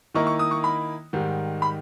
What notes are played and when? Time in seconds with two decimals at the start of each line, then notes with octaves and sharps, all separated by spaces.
0.15 D#3 A#3 E4 A#4 D#5 C#6
0.27 C#6
0.39 D#6
0.51 C#6
0.64 B5
1.13 G#2 D#3 G3
1.62 B5